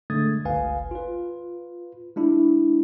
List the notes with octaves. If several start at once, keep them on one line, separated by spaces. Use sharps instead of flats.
D3 G#3 A3 D#6 G#6 A6
G1 C#2 B4 F5 G#5
F4 B4
G#3 D4 E4